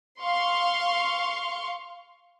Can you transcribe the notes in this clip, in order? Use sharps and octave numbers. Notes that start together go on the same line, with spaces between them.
F5 C6 C#6